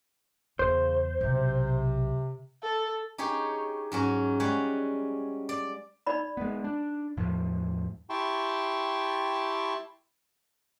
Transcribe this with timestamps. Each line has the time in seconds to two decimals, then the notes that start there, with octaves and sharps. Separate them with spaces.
0.59 E2 C#3 C5
1.21 B1 C3
2.63 A4
3.18 D#4 G4 G#4 C#5
3.92 G#2 F#3 C#4
4.40 G3 G#3 C#5 F#5
5.49 D5
6.07 D#4 D5 B5
6.37 G#3 B3
6.64 D4
7.17 E2 A2 F3
8.10 E4 G4 G5 A5 C6 C#6